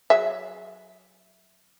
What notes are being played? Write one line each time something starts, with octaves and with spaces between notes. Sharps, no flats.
F#3 G#4 E5